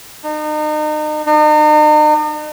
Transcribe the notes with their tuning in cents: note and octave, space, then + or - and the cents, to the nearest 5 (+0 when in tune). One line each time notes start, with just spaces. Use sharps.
D#4 -35
D#4 -40